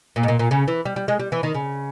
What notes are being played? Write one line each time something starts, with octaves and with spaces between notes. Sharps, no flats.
A#2
G#2
A#2
A#2
C#3
E3
G3
G3
G#3
G3
E3
D#3
C#3